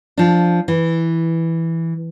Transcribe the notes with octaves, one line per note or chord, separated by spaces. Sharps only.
F3 D4
E3